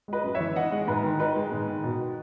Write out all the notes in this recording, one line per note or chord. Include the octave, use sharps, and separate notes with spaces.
G#3 B4 D#5
F#2
C#5 E5
E3
D#4 D#5 F#5
G#3
G#2 B4
D#3
D#4 B4
G#3
G#2
D#3
B2
D#4